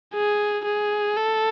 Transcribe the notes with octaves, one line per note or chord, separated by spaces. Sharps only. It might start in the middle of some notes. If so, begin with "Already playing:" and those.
G#4
G#4
A4